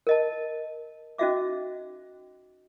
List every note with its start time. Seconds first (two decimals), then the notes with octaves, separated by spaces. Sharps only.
0.07 A#4 D#5 A5
1.18 C#4 D#4 F#4 D#5 E5 D6